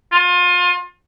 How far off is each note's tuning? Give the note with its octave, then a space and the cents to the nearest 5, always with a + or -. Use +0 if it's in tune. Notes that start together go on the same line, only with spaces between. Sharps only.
F4 +30